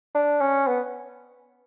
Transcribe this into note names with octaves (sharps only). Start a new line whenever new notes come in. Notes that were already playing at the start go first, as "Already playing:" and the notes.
D4
C#4
B3